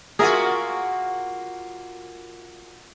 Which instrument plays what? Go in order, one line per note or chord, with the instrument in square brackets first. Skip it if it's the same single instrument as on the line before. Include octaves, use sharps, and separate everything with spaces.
[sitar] A#3 F4 F#4 [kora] G#4 A#4 E5